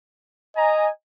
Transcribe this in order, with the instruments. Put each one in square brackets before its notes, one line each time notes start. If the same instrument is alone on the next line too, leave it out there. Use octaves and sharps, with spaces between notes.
[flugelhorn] D#5 [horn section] G#5 A#5